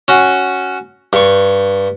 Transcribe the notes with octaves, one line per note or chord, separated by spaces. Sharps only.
C#4 F#4
G2 C#6